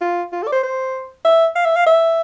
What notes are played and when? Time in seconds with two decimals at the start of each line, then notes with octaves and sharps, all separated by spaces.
0.01 F4
0.32 F4
0.43 A4
0.47 D5
0.53 C5
0.63 C5
1.25 E5
1.55 F5
1.66 E5
1.76 F5
1.87 E5